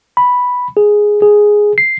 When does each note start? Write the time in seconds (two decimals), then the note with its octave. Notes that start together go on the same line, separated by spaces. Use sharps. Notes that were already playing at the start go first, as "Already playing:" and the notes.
0.17 B5
0.77 G#4
1.22 G#4
1.78 C7